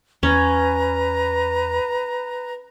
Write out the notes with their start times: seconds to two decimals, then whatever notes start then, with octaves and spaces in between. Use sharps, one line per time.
0.23 E2 C#4 B4 A#5